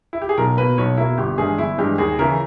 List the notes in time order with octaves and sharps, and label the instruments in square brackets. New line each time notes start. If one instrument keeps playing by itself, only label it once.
[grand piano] E4
G4
G#4
B1 A#4
B2 A#3 B4
B1 C#5
B2 A#3 E4
G1 G4
G2 E3 G#3 G#4
G1 E4
G2 E3 G#3 G4
D#2 G#4
C#3 E3 A#4